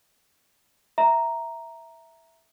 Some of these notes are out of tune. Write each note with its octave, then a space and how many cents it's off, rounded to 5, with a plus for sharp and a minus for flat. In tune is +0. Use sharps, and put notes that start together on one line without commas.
E5 +0 A#5 +0